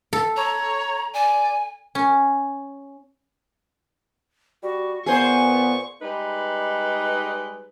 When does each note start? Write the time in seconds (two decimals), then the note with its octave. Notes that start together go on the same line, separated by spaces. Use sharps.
0.13 A4
0.37 C#5 A#5
1.14 D5 G#5
1.95 C#4
4.63 G3 F#4
5.06 A#2 B3 G#4 C5 C#6
6.02 G3 G#3 D#4 B4